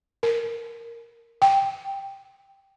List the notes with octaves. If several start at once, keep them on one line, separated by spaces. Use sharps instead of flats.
A#4
G5